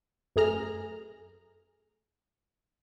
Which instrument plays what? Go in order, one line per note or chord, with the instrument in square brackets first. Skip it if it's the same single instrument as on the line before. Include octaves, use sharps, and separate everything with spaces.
[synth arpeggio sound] F#2 A3 G#4 A#5 F6